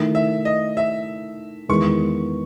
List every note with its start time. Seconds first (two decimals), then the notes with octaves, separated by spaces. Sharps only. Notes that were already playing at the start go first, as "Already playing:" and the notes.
Already playing: D#3 A3 E4
0.15 E5
0.45 D#5
0.77 E5
1.69 E2 D#3 G#3 B3 D#4 C#6